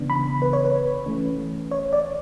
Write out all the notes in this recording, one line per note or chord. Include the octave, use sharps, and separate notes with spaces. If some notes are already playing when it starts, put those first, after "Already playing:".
Already playing: C#3 E3 B3 D4
B5
B4
C#5
B4
E3 A3 C#4
C#5
D5